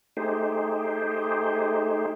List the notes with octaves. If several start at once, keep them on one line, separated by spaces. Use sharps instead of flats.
A3 D#4 G4 G#4 C5